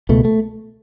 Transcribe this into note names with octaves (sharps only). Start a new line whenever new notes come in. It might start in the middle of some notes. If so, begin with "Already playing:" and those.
C#2 B2 A3
A3